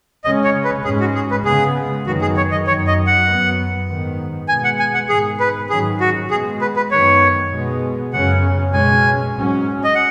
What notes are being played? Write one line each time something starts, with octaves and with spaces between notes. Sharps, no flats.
C#3 G#3 C#4 D#5
C#5
B4
G#2 G#3 C#4 G#4
F#4
G#4
B4
C#3 G#3 B3 G#4
F#2 D#3 F#3 B3 F#4
G#4
C#5
D#5
F#2 D#3 F#3 C#5
D#5
F#5
F#2 F#3 B3
G#2 D#3 B3
B2 G#3 B3 G#5
F#5
G#5
F#5
G#2 D#3 G#3 G#4
B4
G#2 D#3 F#3 C#4 G#4
F#4
B2 G#3 B3 G#4
B4
B4
F#2 D#3 B3 C#5
B2 G#3 B3
F#2 C#3 F#3 C#4 F#5
B2 G#3 C#4 G#5
G#2 F#3 C#4
D#5
F#5